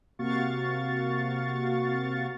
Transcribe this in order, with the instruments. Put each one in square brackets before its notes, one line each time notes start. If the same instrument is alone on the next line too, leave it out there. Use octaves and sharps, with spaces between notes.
[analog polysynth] C3 A#3 F#4 F5 C#6 A6